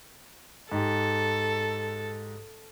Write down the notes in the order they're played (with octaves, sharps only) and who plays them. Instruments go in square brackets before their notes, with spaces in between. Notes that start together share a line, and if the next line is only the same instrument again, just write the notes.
[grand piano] G#2 G4 [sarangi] A4